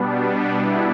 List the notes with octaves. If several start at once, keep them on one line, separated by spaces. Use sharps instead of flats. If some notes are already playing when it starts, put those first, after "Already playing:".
Already playing: B2 G3 B3 D4
E4